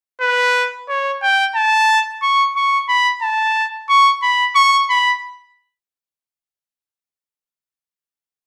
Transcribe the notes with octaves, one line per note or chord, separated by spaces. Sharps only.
B4
C#5
G5
A5
C#6
C#6
B5
A5
C#6
B5
C#6
B5